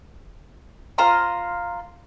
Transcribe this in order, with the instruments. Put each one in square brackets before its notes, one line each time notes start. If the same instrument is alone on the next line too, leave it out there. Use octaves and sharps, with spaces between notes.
[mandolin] F4 C5 A#5 C6